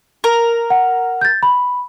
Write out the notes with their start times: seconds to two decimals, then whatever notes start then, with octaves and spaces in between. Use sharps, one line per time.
0.24 A#4
0.70 F#5
1.21 G6 A6
1.43 B5